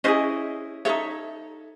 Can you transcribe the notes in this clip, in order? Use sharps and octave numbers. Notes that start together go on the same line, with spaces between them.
C#4 E4 G#4 C5 D#5
D#4 F#4 A4 C#5 E5